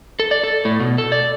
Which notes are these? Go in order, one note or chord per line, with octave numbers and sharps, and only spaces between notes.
A4
D5
A4
A2
B2
A4
D5